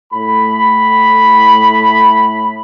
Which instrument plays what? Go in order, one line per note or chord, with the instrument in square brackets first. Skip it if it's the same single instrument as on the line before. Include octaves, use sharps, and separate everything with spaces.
[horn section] A2 B5